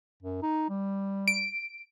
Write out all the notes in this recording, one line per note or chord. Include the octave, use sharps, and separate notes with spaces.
F#2
D#4
G3
D7